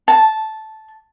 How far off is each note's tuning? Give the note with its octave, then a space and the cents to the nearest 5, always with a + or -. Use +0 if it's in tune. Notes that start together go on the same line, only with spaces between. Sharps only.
A5 -10